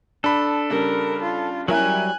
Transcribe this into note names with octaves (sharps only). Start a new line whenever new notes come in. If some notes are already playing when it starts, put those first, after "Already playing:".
D4 A4 B5
C#3 G3 A#4
F4
F#3 G3 C#4 E4 A#4 G#5 F#6